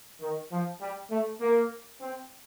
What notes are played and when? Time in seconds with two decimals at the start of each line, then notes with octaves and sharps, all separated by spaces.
0.21 D#3
0.51 F3
0.81 G3
1.10 A3
1.41 A#3
2.01 C4